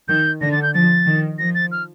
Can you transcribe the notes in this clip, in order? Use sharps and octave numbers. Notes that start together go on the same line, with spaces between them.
D#3 G6
D3 A#6
A6
G6
F3 A6
D#3
F3 A#6
A6
F6